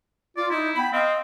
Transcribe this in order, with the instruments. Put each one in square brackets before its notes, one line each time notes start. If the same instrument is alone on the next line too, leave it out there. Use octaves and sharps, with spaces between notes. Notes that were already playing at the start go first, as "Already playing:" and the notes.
[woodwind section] F4 [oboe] D5
[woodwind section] D#4 [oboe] E4
[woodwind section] B3 G5 B5
[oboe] C4 [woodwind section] D#5 F5